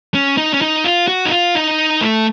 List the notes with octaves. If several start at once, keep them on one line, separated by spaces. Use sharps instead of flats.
C#4
D#4
C#4
D#4
F4
F#4
D#4
F4
D#4
A3